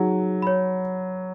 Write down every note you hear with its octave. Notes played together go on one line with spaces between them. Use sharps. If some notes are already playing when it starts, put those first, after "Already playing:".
Already playing: F#3 D#4 G#4 C#5 F#5
C#5 B5